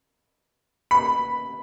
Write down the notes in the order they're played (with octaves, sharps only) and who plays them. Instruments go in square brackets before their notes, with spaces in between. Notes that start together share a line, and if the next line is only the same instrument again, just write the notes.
[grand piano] B5